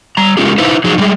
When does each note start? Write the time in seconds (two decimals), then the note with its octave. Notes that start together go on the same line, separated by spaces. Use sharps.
0.17 G3 A#5
0.37 G#3 A3 C#4 F4 G4 G#4
0.58 D#4 E4 B4 C5
0.84 F3 F#3 D#4 G#4
0.98 D3 G3 G#3 G#4